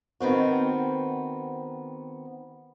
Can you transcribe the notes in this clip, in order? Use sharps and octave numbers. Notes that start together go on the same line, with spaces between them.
D#3 B3 C4 F#4